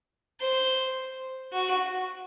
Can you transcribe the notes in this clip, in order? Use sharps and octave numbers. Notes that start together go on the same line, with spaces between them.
C5
F#4